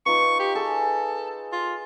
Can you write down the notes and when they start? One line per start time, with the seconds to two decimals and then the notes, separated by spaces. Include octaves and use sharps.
0.06 D#4 F4 B4 C#6
0.39 G4
0.55 G#4 A4
1.52 F4